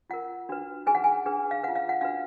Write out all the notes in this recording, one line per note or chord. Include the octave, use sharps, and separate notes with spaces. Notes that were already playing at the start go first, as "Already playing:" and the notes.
F4 A#4 F#5
D4 F#4 B4
D#4 G#4 B4 G#5
F#5
G#5
D4 G#4 B4
F5
F4 B4 F#5
F5
F#5
D4 F#4 B4 F5